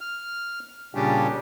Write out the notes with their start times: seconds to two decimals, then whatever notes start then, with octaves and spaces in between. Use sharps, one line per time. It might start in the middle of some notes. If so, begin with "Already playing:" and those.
0.01 F6
0.95 A#2 C#3 G3 C#4 D4 G4